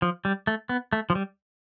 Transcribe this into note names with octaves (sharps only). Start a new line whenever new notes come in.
F3
G3
A3
B3
A3
F3
G3